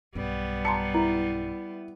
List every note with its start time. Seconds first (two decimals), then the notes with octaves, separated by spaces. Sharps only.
0.15 B1 G2 G3 B3
0.65 A5 A#5 C6 C#7
0.94 E4 A#5